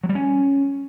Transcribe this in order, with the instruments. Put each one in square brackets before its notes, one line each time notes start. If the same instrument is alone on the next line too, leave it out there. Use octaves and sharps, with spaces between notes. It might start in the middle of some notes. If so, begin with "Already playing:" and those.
[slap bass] F#3
G3
C#4